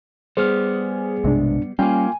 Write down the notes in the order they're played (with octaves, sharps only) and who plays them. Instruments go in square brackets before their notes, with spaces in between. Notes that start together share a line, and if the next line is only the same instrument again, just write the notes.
[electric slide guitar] G3 B3 [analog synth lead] G#4 [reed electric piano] C5 F6
[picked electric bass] B1 C3 G#3 [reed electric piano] G2 D4
[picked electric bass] G3 C#4 [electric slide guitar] A#3 F4 [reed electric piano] G5 [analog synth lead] G#5